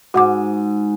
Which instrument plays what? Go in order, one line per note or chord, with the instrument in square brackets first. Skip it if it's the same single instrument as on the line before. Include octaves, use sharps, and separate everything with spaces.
[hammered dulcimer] G#2 [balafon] F#4 F#5 D6